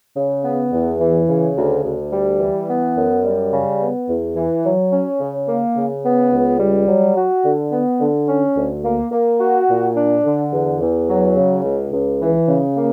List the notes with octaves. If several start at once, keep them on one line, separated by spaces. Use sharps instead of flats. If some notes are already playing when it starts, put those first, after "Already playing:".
C#3
B3
E2
E3
C#3
D2
D2
G3
E3
B3
F#2
G3
C#3
B3
E2
E3
F#3
C#4
C#3
A#3
C#3
B3
C#2
G3
F#3
F#4
D3
B3
D3
C#4
D2
A#3
A#3
F#4
A#2
D4
D3
E2
E2
F#3
C#3
C#2
C#2
E3
C#3
A#3